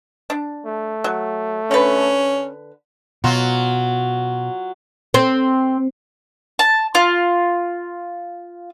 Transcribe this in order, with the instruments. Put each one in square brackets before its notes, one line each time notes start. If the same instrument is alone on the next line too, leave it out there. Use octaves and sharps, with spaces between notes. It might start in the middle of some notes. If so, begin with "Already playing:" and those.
[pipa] D4
[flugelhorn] A3
[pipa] F#3
[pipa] D3 B4 [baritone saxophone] C#4
[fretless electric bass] B2 [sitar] F#3 F4
[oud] C4
[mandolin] A5
F4